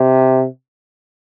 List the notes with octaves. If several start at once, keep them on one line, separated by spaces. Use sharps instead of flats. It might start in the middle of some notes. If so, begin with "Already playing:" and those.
Already playing: C3